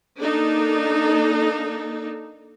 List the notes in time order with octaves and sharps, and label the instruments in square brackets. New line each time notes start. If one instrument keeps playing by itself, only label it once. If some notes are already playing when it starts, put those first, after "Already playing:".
[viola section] A#3 D4 D#4 A4